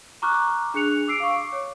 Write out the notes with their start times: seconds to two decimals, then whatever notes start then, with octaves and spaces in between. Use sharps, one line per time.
0.22 A#5 C#6 D6 F6 F#6
0.74 D4 G#4 F#6 C#7 F7
1.08 D6 E6 C7 D7
1.20 F5 C#6
1.36 D6
1.52 C#5